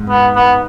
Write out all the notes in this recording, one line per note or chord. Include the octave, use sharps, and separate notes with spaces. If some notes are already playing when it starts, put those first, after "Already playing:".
Already playing: G#2
B3
B3